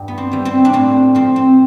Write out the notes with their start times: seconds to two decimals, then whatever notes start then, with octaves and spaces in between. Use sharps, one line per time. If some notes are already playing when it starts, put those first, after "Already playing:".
Already playing: G2 E3 G3 G4
0.08 B3
0.18 C4
0.32 E3 G3
0.45 C4
0.65 D4
0.73 A2 C4
1.15 F3 C4
1.36 C4